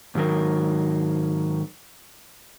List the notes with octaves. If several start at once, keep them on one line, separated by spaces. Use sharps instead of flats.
G#2 D#3 F#3 A#4